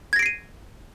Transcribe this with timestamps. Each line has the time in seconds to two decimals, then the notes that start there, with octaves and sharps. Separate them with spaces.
0.13 G#6
0.16 A#6
0.19 D7
0.23 C7
0.26 D#7